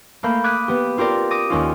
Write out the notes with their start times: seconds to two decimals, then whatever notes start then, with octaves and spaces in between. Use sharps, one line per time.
0.23 A3 A#3 F5 B5 G6
0.44 D6 D#6 F#6 G#6 B6 D#7
0.68 B3 G4
0.97 C4 F4 G4 A#4 D5
1.31 D6 D#6 A#6 D#7
1.50 D#2 C#4 F4